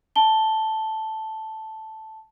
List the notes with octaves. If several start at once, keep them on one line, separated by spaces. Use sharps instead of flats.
A5 G7